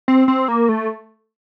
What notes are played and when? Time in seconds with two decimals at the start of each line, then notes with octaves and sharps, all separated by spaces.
0.08 C4
0.28 C4
0.48 A#3
0.69 A3